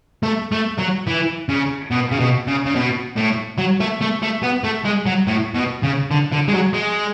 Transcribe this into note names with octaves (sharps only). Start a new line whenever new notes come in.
A3
A3
F#3
E3
C#3
B2
C#3
B2
C#3
C#3
B2
A2
F#3
A3
A3
A3
B3
A3
G#3
F#3
A2
B2
C#3
D3
D3
G#3
F#3
G#3